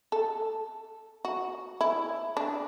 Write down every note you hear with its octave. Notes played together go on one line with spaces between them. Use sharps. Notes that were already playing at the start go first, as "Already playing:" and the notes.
A4
F#4
E4
D4